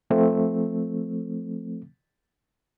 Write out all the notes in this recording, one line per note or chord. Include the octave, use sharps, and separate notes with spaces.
F3 A3 C4